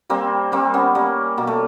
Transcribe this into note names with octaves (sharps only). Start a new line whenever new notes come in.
G3 A#3 C4
G3 A#3 C4
B3 C#4
G3 A#3
B2 A#3
A3